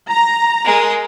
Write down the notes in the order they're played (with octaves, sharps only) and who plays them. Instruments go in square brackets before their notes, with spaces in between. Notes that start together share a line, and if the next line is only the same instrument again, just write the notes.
[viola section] A#5
[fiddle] G#3 A#4